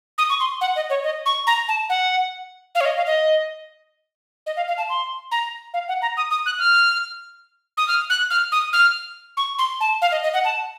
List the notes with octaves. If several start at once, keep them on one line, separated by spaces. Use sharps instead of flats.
D#6
C#6
C6
F#5
D#5
C#5
D#5
C#6
A#5
A5
F#5
F5
C#5
D#5
F5
D#5
D#5
F5
F5
A5
C6
A#5
F5
F#5
A#5
D#6
D#6
F#6
F6
D#6
F6
F#6
F6
D#6
F6
C#6
C6
A5
F5
D#5
D#5
F#5
A5